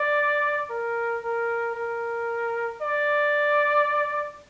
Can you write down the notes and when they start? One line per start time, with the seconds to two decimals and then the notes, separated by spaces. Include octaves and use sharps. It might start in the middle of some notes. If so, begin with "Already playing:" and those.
Already playing: D5
0.70 A#4
1.24 A#4
1.75 A#4
2.82 D5